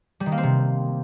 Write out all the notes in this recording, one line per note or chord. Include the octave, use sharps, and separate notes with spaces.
G3
D#3
A#3
C4
C3